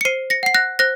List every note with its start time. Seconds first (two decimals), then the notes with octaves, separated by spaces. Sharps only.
0.01 C#7
0.05 C5 C7 D#7
0.30 A#6 C#7
0.43 F#5 C7
0.55 F#6 A#6
0.79 C5 F#6 A#6